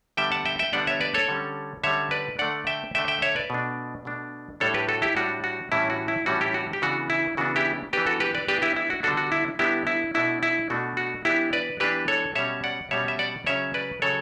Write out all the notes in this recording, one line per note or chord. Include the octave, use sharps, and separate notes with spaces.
D3 G3 B3 D4 E5 G5
F#5 A5
E5 G5
E5 G5
D3 G3 B3 D4 D5 F#5
C#5 E5
B4 D5
A4 C#5
D3 G3 C#4
D3 G3 C#4 C#5 E5
B4 D5
D3 A3 D4 D5 F#5
E5 G5
D3 A3 D4 E5 G5
E5 G5
C#5 E5
B4 D5
B2 A3 D4
B2 A3 D4
A2 G3 D4 A4 C#5
G4 B4
F#4 A4
E4 G4
A2 G3 D4 F#4
F#4
A2 E3 G3 C#4 E4
F#4
E4
A2 E3 G3 C#4 F#4
E4 G4
F#4
G4
C#3 E3 B3 D4 F#4
E4
C#3 E3 B3 D4 F#4
E4 G4
E3 B3 D4 G4 B4
F#4 A4
G4 B4
B4 D5
E3 B3 D4 G4 B4
E4 G4
E4
F#4
D3 G3 B3 D4 F#4 A4
F#4
E4
D3 G3 B3 D4 E4 G4
E4
B2 A3 D4 E4
E4
B2 A3 D4 F#4
F#4
E3 B3 D4 E4 G4
B4 D5
E3 B3 D4 G4 B4
A4 C#5
B2 G3 C#4 C#5 E5
D5 F#5
B2 G3 C#4 C#5 E5
E5
D5 F#5
C#3 F#3 C#4 C#5 E5
B4 D5
C#3 F#3 A4 C#5